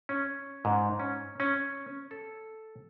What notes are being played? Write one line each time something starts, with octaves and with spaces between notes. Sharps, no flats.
C#4
G#2
C#4
C#4
A4